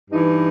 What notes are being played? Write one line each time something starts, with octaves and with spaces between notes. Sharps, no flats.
G2 E3 D#4